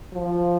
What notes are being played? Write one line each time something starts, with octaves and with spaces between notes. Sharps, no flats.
F3